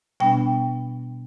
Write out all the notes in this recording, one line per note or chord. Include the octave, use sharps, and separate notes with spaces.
B2 G3 B3 D4 G5